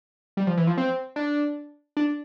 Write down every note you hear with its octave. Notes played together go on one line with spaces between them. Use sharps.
G3
F3
E3
F3
C4
D4
D4